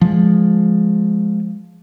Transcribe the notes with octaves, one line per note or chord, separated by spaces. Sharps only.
F3 G#3